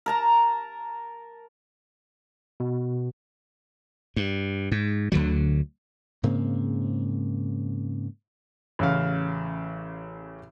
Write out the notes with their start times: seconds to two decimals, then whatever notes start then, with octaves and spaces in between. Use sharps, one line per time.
0.06 A#4 A5 A#5
2.60 B2
4.16 G2
4.71 G#2
5.12 D2 D3 F#3
6.23 G#2 C#3 A#3 C4
8.79 A1 C#3 F5